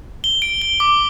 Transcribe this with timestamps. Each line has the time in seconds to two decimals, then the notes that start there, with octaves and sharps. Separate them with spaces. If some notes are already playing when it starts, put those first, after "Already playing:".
0.24 G7
0.42 D7
0.62 G7
0.80 D6